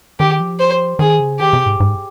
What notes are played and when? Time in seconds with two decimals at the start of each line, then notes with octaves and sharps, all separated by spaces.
0.20 D#3 G4
0.40 F3
0.60 C5
0.99 D#3 G#4
1.20 C#3
1.40 D#3 G4
1.53 C3
1.66 G#2
1.80 G#2